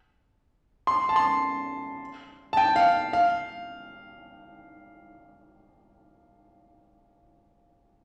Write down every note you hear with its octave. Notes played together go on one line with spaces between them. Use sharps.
C6
A5
C6
A5
G5
F5
F5